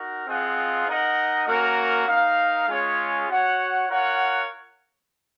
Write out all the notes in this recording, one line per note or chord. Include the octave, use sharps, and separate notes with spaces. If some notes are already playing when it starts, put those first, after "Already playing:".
Already playing: D#4 F#4 A#4
C4 F4 G#4 D#5 F#5
D#4 A#4 D#5 F#5
A#3 C#4 F#4 A#4
D#4 A#4 F5
G#3 C#4 F4 G#4 C#5
F#4 C#5 F#5
F4 A#4 C#5 F#5